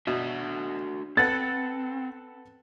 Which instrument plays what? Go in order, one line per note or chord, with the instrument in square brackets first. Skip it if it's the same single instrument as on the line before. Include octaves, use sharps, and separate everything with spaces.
[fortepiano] B2 [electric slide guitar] D4 F#4 E5
[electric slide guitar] C4 [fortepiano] A4 B4 F#5 [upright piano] A6